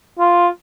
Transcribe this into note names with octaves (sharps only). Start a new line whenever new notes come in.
F4